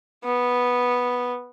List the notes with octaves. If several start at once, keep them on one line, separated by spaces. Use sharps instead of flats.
B3